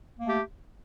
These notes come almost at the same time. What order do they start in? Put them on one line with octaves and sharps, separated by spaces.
A#3 A3 G4